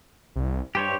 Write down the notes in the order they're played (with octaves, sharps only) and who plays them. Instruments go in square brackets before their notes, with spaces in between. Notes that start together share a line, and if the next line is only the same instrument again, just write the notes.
[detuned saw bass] C2
[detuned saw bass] G2 [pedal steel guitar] G4 C5 C#5